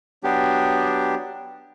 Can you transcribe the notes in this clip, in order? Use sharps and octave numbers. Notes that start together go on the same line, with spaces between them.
F#3 B3 D4 G4